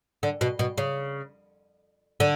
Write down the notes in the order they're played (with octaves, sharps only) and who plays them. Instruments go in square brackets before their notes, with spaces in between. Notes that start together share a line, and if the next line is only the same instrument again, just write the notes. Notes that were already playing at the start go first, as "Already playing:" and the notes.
[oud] D3
B2
B2
C#3
D3